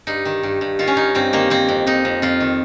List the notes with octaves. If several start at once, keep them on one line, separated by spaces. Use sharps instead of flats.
G2 D#4
D#3
G2
G2
D#3 F4
C#4
D#3 D#4
G2 C4
D#3 A#3
D#3 C4
F2
F2 D#4
F2
F2 F4
D#3